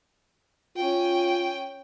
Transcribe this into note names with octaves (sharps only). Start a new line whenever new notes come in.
C#4 F4 G5